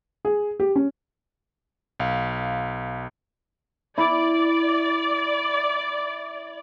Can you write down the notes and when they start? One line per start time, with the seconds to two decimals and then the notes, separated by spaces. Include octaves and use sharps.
0.25 G#4
0.60 G4
0.76 C#4
2.00 B1 F5
3.98 E4 D5